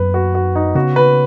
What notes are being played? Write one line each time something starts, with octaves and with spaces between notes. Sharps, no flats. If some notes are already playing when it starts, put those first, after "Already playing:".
Already playing: F#2 F#3 B3 B4
F#4
F#4
D#4
C#3 B3 F#4
B4